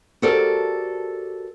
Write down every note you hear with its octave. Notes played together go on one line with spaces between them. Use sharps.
F#4 G4 A4 A#4 C5 D5